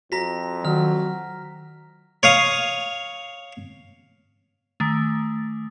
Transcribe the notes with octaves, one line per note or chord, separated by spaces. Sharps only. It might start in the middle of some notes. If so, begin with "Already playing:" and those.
F2 F#4 A#5 A#6 B6
D#3 F#3 F6
C#5 F5 D#6
D#3 A3